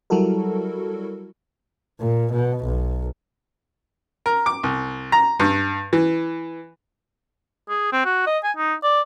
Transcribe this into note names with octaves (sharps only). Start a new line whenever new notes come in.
F#3 G3 E4 F#4 A4 A#4
A#2
B2
B1
A#4
D6
C2
A#5
G2
E3
G#4
C4
F#4
D#5
G#5
D#4
D5